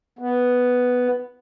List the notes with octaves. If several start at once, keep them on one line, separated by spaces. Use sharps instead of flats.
B3